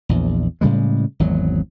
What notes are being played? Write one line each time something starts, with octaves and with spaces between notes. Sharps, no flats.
A#1 E2
A2 C#3 G3 G#3
G#1 E2 F#3